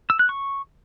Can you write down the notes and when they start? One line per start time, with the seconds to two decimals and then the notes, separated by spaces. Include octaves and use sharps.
0.10 E6
0.19 F#6
0.29 C#6